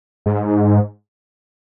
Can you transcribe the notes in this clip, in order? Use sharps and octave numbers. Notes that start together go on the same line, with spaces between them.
G#2